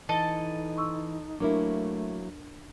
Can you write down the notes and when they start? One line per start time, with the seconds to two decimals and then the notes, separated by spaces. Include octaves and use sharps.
0.09 E3 D#4 A4 D#5
0.77 C6 C#6 E6
1.40 F#3 A3 A#3 D4 E4 A#4